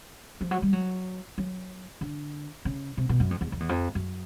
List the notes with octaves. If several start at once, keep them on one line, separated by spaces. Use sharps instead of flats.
F3
F#3
G3
F#3
F#3
D3
C#3
C3
B2
F#2
F2
E2
F2
E2
F2
F#2